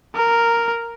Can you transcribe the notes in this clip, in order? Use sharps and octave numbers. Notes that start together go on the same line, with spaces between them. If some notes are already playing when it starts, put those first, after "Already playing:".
A#4